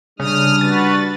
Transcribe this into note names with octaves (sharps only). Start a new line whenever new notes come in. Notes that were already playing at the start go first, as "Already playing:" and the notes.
C#3 G3 D4 D#6 F6
F#4 B4 A6